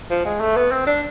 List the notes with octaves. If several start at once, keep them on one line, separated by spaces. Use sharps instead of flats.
F3
G#3
A3
B3
C4
D4